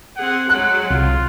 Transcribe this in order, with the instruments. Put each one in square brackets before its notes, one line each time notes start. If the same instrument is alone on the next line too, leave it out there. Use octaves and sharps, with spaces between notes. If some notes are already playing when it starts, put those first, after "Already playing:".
[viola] C4 G#4 [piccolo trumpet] F#5
[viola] F#3 G#3 [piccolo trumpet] F#5 [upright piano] F#6
[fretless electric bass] C2 [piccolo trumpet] F4